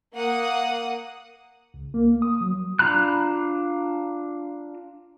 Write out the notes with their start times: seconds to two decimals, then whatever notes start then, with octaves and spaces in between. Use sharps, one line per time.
0.14 A#3 F#5 D#6
1.74 C#2
1.94 A#3
2.22 D#6
2.41 F#3
2.79 D4 F4 A#5 B5 F#6